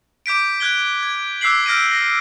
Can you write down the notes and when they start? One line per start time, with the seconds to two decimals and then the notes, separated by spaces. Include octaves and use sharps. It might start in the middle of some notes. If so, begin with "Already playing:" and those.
0.26 D6 G6 B6 D7
0.60 F#6 G#6 G7
1.03 G#6
1.41 D6 E6 F#6 B6 C7 F#7
1.66 F6 G6 A#6 D7 D#7
1.92 A#6